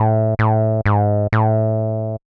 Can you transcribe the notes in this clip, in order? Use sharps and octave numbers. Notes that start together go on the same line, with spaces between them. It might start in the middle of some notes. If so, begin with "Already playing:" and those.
Already playing: A2
A2
G#2
A2